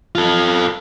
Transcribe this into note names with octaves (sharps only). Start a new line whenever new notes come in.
F4 A4